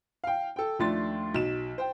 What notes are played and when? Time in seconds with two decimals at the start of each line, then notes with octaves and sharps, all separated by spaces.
0.24 F5 G5
0.56 A4 G5
0.79 D#2 F3 A3 D4 C6 A6
1.34 B1 F#3 E7
1.78 C5 G5